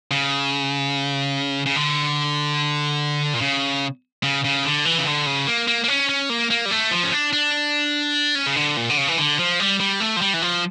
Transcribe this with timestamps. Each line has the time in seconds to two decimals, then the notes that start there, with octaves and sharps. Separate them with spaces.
0.11 C#3
1.66 C#3
1.76 D3
3.34 A#2
3.41 C#3
4.23 C#3
4.44 C#3
4.65 D3
4.85 E3
4.98 C#3
5.06 D3
5.26 C#3
5.47 A#3
5.68 A#3
5.84 A#3
5.88 C#4
6.09 C#4
6.30 A#3
6.50 A#3
6.66 G3
6.71 A3
6.91 F3
7.03 C#4
7.12 D4
7.33 D4
8.35 C#4
8.47 C#3
8.56 D3
8.77 A#2
8.90 D3
8.97 C#3
9.08 E3
9.18 D3
9.39 F3
9.60 G3
9.80 G3
10.00 A3
10.17 F3
10.21 G3
10.34 E3
10.42 F3